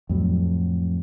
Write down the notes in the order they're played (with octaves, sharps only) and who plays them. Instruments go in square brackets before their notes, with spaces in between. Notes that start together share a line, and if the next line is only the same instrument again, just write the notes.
[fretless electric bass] F2 A2 F#3